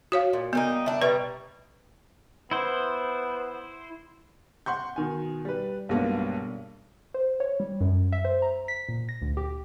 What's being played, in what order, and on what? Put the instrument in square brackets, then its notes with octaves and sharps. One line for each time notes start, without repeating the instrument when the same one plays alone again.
[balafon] F#4 C#5 F5
[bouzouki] A#2
[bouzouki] G3 A#3 D#4 [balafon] B3
[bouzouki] D4 E4
[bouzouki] B2 G3 A#5 [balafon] B4
[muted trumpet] B3 [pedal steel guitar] E4 C5
[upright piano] F#5 C6 C#6 G6
B2 D#3 G#5
G3 B4
B1 G2 G#3 A#3 B3
[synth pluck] C5
C#5
G3
F#2
E5
C5
A#5
B6
A#2
A#6
D2
G4